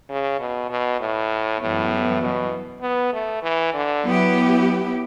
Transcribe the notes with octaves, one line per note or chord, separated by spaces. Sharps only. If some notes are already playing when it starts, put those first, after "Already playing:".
C#3
B2
B2
A2
F#2 A2 E3 G3 B3
B2
B3
A3
E3
D3
F#3 B3 E4 G4